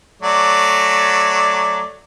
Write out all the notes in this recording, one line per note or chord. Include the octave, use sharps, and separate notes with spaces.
F#3 A3 D5